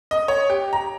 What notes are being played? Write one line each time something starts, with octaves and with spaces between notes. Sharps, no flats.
D#5
C#5
G4
A#5